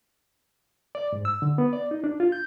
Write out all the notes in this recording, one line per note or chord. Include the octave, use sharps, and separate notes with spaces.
D5
G#2
E6
D3
B3
D5
D#4
D4
F4
G6